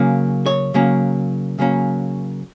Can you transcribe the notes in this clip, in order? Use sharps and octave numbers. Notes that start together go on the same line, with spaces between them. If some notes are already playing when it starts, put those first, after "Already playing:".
Already playing: C#3 F#3 A#3 C#4
C#5
C#3 F#3 A#3 C#4
C#3 F#3 A#3 C#4